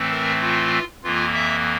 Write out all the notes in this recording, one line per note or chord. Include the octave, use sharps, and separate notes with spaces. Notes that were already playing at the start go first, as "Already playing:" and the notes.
Already playing: A2 E3 A3 C4
A#4
F4
F2 E3 A#3 F4
E5